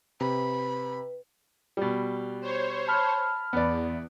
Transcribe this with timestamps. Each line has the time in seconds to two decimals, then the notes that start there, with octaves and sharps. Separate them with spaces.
0.21 C3 B4 B5
1.77 B2 G3
2.41 C5 C#5
2.88 A5 B5 F6
3.53 E2 B3 D5